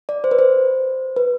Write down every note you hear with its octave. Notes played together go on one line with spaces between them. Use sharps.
D5
C5
B4
C5
B4